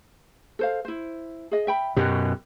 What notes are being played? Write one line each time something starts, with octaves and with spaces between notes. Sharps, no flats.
A4 C5 F5
E4 C5
G#4 D#5
E5 G5 B5
F#2 B2 G4